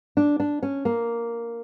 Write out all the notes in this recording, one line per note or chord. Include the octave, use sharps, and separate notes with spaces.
D4
D4
C#4
A#3